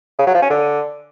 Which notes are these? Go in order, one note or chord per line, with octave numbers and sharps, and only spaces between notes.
C#3
F#3
F3
C#4
D3